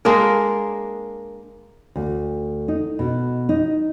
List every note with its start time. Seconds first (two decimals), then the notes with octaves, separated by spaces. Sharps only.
0.05 G#3 A#3 D4 A#4
1.96 D2
2.68 D#4
2.99 B2
3.49 D#4